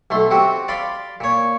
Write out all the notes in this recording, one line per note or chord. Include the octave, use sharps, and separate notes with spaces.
B1 A3 C6
C4 F#4 G4
D5 F5 B5 C6
A#2 C#5